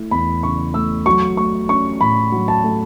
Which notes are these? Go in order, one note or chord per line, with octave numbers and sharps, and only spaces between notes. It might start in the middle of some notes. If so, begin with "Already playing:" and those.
Already playing: A3 E4
E2 B5
C#3 C#6
A3 E6
F#3 C#6
A3 C#6
C#4 C#6
A2 B5
F#3
A5
A3